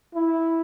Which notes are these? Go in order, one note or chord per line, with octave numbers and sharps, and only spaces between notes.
E4